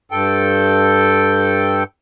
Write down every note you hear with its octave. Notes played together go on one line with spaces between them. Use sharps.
G2 A4 G5